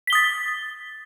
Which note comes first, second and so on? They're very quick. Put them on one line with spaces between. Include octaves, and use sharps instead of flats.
B6 G7 D#6 A6